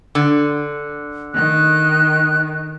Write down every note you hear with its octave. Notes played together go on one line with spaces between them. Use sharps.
D3
D#3 F#6